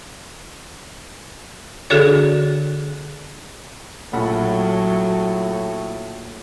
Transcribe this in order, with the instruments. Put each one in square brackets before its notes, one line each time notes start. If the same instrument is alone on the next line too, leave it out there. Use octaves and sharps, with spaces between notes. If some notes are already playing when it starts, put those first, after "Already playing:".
[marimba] D3 D4 F#4 G#4 A4 C#5
[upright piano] A#1 F#5 B5 [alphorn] A2 [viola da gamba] F#3